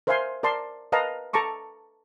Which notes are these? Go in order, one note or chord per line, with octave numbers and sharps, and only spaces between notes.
A#4 C5 E5 F5 G#5 C6
A#4 D5 A5 C6
A#4 B4 D#5 F5 A5 A#5
A4 A5 A#5 C#6 D6